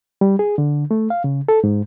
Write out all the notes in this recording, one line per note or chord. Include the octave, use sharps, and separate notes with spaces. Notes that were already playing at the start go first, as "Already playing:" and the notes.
G3
G#4
D3
A3
F5
C#3
A4
G#2